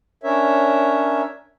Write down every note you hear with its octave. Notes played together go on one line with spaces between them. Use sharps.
C#4 D4 A#4 C#5 E5